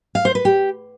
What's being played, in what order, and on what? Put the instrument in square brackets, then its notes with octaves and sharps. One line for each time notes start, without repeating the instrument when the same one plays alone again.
[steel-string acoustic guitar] F5
C5
B4
G4